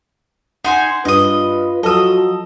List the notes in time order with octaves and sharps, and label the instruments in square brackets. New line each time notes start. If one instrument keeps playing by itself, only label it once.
[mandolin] D#4 C5 G#5 [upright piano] F#5
[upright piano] G2 [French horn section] F4 B4 [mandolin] D#5 D#6
[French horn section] F3 F#3 [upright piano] A4 E6 [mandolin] D#5 D#6